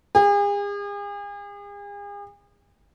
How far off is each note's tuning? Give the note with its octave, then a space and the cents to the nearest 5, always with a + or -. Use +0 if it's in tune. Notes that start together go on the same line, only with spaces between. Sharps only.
G#4 -40